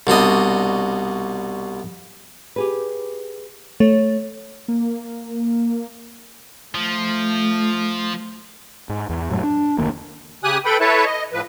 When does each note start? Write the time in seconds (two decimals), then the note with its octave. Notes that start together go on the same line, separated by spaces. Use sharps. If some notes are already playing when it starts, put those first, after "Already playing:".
0.07 C2 B2 D4 D#5
2.56 G4 G#4 B4
3.80 A3 C#5
4.68 A#3
6.75 F3 A3
8.89 G#2
9.09 E2
9.31 F#2 A2 F#3
9.43 D4
9.78 F1 D2 D#3 A#3
10.44 C#3 G4 G#5 D#6 F#6
10.65 A4 B4 G5 B5
10.80 E4 A4 B4 C#5 E5 A5
11.05 D#5
11.33 A2 F3 B4